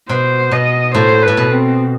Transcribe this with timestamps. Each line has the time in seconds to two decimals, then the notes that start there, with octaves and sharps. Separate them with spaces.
0.09 B2 C5
0.51 B2 D#5
0.94 A2 C5
1.23 A2 B4
1.37 B2
1.51 C4